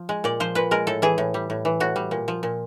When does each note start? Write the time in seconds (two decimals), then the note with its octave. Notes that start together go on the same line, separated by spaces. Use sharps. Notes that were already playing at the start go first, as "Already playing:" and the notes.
Already playing: F3
0.09 G#3
0.24 A#2 D5
0.40 F3 C5
0.55 A#2 B4
0.71 G#3 A#4
0.87 A2 A4
1.02 E3 G#4
1.18 A2
1.34 G3
1.50 A2
1.65 E3
1.80 A2 F#4
1.96 G3
2.11 A#2
2.28 F3
2.43 A#2